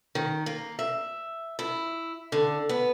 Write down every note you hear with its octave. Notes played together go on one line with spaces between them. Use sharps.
D#3
A#3
E5
E4
D3
B3